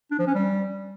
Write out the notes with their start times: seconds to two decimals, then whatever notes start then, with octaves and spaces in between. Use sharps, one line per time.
0.11 D4
0.19 F3
0.27 C#4
0.35 G3